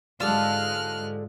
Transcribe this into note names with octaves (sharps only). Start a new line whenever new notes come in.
G#2 D3 G#3 F4 G4 A4 F6 F#6